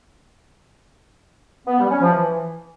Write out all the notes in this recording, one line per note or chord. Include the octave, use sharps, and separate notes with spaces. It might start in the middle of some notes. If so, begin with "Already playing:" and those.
B3
G3
C#4
F3
E3